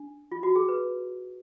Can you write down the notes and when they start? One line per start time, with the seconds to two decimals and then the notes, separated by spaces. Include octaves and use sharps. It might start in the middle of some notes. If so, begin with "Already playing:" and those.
Already playing: D4
0.32 F4
0.43 F#4
0.56 G#4
0.69 B4